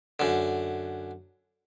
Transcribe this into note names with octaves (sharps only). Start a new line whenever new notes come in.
F#2 D3